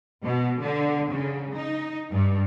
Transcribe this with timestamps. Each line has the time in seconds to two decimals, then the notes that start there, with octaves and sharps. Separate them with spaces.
0.23 B2
0.61 D3
1.11 C#3
1.56 D#4
2.11 G2